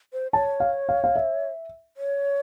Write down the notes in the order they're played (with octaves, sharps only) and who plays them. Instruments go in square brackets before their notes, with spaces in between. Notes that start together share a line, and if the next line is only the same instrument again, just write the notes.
[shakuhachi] C5
[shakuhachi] C#5 [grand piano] A5
[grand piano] F5
F5
F5
E5
[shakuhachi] C#5